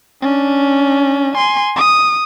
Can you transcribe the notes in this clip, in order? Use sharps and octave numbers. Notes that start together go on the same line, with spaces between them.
C#4 D4
G#5 C6
D#6